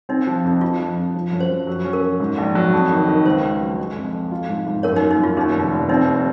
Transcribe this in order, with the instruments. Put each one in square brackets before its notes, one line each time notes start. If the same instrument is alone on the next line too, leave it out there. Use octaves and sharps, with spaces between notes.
[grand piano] C4 [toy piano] D#4
[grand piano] F3
F2
[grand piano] F3 [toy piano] F4
[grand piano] F3
F2
F3
F#2
[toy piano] C5
[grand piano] F#2
F#3
C#4
[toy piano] A#4
[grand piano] F#3
G#2
A#1
F#3
F2
D#3
D#3
[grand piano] C#2 [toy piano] C5
[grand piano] C#2
F#3
G#3
F2
F2
F4
G#2
G#2
[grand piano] F#2 [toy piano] A#4 C#5
[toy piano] D#4
[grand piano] A#3
[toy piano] D#4
[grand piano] F#2 [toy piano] F4
[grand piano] D#2 [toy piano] D#4
[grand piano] F1
F1
[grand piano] C4 [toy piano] D#4
[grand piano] D#2